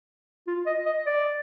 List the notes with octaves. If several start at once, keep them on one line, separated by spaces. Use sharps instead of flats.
F4
D#5
D#5
D5